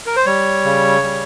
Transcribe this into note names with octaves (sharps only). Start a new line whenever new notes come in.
A#4
C5
G3 C#5
C#3
G3